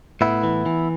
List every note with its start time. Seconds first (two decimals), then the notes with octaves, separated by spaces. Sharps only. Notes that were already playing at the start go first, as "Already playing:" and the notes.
0.21 A2 B3 E4
0.44 E3
0.66 E3